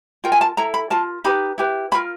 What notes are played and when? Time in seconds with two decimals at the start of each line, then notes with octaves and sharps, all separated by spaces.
0.24 F4 A#4 G5
0.32 G#5
0.41 A5
0.57 E4 A4 A#5
0.74 B5
0.90 F4 A#4 A5
1.24 D#4 G4 B4 B5
1.58 E4 G4 B4
1.92 C#4 F4 A#4 B5